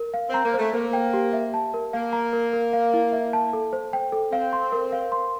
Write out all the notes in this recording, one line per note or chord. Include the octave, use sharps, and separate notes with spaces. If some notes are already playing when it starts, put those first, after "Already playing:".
Already playing: A#4
F5
C4
A#5
A#3
A3 C5
A#3 C5
G5
G4
E5
A5
A#4
A#3 F5
A#5
A#4
A#4
F5
E4
E5
A5
A4
C5
G5
A4
C4 F5
C6
A#4
F5
C6